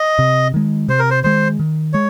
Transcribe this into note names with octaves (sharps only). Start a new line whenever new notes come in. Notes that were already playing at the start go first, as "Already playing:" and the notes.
Already playing: D#5
C3
D#3 G#3
C3 C5
A#4
C5
D#3 G#3 C5
D#3
G#3 C#5